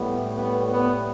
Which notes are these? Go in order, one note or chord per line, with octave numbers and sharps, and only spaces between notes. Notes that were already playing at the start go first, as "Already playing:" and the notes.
Already playing: A2 G3 B3
B3
B3